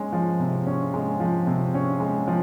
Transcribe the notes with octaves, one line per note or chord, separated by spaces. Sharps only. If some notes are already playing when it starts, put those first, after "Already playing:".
Already playing: G#3 C#4
F3
C3
C#4
G#3
F3
C3
C#4
G#3
F3